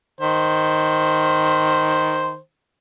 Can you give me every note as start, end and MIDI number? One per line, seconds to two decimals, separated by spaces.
0.21 2.37 51
0.21 2.37 72